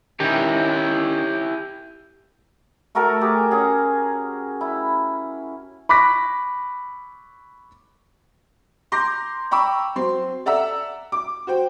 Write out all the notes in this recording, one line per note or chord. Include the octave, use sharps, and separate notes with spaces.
D#3 C#4 D#4 E4 G4
A3 F#4 A4 A#4
G4 G#4 D6
C#4 F#4 G#4
E4
B5 C#6 D6 F#6 A#6 B6
A#5 C6 D6 G6 A#6
G5 A#5 B5 C#6 D6 E6
F#3 C4 C6
A4 D5 E5 F#5 A#5 E6
D6
F#4 C5 G5